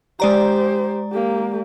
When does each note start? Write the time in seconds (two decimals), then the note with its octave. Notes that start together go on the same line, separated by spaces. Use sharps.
0.20 G#3 G4 C5 D5 A#5
1.12 A#3 G4